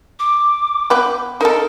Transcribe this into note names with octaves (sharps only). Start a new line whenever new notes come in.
D6
B3 B4 G5
D#4 A4 A#4